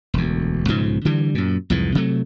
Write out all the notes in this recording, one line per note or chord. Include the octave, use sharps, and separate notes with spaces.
E1 D2
B1 G#2 C#3 F3
D3 E3 G3
F#2 A#2
C2 F2 G#2 E3
C3 F#3 A3